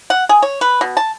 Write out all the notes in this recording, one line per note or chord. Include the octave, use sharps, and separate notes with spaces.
F#5
G#4
C#5
B4
B2
A5